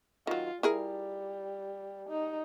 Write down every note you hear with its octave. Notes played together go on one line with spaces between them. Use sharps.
D#3 F#3 F4
G3 E4 G#4 A#4
D#4